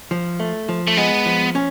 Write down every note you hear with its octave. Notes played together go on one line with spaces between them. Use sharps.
F3
A3
F3
A3
G#3 B3
F3
C#4